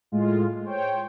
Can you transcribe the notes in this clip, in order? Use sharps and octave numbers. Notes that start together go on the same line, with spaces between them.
A2 G#3 F4
C5 C#5 G5